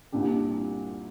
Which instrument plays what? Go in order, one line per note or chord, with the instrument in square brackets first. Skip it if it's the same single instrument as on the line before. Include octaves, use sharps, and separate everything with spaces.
[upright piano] C2 A#2 G3 D4 G4